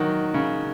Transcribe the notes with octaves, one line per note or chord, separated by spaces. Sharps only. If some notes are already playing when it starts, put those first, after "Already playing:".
Already playing: D#3 F#3
C#3